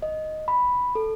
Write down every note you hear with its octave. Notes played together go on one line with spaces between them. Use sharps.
D#5
B5
A4